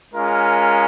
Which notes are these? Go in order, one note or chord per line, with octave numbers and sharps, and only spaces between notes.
G#3 C#4 F4 A#4